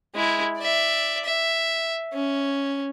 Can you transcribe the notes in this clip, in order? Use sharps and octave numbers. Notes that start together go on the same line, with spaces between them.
G#3 E4
D5 E5
E5
C#4